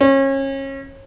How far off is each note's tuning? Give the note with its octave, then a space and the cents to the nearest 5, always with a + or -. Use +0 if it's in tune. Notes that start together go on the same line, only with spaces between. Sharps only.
C#4 -30